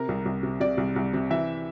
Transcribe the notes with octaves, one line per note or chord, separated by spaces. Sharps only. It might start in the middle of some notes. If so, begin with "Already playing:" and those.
Already playing: C3 A#4
C2
C2
C3
C3 D5
C2
C2
C3
E3 E5